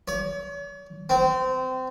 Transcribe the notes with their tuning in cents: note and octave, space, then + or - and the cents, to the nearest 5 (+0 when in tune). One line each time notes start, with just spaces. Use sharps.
C#5 +45
C4 -25